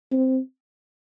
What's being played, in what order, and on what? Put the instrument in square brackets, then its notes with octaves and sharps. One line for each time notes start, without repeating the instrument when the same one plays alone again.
[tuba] C4